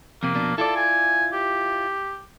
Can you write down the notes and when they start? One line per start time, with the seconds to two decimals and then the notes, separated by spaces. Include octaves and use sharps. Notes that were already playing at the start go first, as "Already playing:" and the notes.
0.23 F2 C3 A#3
0.35 F2 B2 D4
0.58 E4 F4 A4 D5
0.77 G#5
1.33 G4